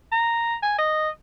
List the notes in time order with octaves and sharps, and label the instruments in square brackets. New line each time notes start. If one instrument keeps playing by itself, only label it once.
[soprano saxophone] A#5
G#5
D#5